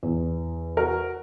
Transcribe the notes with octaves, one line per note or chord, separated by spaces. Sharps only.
E2
F#4 A#4